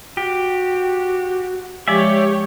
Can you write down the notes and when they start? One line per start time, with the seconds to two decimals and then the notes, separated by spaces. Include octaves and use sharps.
0.17 F#4 G4
1.88 F3 G#3 G4 C#5 D5 E5